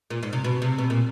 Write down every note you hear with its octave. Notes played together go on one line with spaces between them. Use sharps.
A#2
G#2
C3
B2
C3
B2
A#2